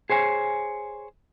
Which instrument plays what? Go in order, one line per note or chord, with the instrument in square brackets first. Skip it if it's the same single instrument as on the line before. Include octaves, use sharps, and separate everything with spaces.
[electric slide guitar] G#4 C5 C#5 G#5